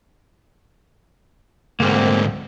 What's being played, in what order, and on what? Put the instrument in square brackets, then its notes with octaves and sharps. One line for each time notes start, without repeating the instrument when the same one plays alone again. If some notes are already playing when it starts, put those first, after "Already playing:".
[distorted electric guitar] D2 G#2 [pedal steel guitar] A#3 C4